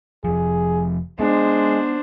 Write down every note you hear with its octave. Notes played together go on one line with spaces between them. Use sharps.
F1 F3 G#4
G#3 B3 D4 C5